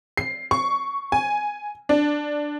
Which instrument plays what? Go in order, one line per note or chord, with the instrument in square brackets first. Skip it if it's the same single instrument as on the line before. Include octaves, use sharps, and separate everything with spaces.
[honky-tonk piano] C7
C#6
G#5
D4